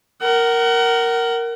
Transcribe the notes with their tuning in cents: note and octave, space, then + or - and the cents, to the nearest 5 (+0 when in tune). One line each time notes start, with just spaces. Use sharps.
A#4 +0 F#5 +30